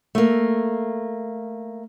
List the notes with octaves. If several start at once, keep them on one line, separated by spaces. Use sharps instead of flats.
A3 A#3